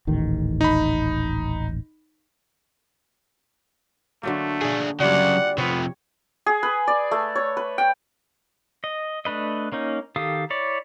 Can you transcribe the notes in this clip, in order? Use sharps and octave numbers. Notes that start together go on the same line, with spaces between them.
D#1 A1 D#3
D#4 B5
D3 F#3 A3 A#3
D4 G#4
C#3 F#3 G3 F4 F#4 D5 F#5
C3 F3 B3 C#5
G#4
B4
D5
A3
C#5
B4
G5
D#5
A3 D4 B4 D#5
A#3 C#4 D#4
D#3 G4 A4 F5 D#6
E4 C#5 D5